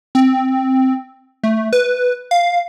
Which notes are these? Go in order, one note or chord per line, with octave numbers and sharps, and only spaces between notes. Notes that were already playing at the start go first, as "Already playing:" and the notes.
C4
A3
B4
F5